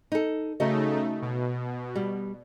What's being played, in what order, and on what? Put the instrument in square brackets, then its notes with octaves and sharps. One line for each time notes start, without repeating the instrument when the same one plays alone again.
[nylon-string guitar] D#4 A4
[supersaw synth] C#3 A3 D#4 [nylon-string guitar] F#4 D#5 E5
[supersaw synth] B2
[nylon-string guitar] G3